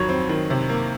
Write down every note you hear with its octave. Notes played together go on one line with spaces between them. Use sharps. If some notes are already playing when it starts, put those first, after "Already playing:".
Already playing: F2 D#3 F#3 C#5
C4
D#3
C3
A#3